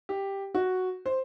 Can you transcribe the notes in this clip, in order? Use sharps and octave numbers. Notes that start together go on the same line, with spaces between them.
G4
F#4
C5